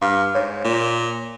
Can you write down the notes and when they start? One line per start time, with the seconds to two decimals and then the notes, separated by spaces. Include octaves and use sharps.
0.02 G2 F5 F6
0.35 G#2 C#5
0.64 A#2